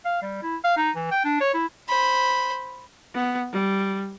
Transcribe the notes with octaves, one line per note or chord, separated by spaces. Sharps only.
F5
G3
E4
F5
D#4
E3
G5
D4
C#5
E4
C5 B5
B3
G3